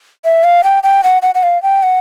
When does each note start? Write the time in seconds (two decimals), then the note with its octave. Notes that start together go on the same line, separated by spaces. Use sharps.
0.25 E5
0.44 F5
0.64 G5
0.83 G5
1.04 F#5
1.22 F#5
1.35 F#5
1.43 F5
1.63 G5
1.83 F#5